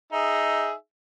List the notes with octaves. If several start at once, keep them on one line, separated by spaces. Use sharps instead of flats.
D#4 G#4 E5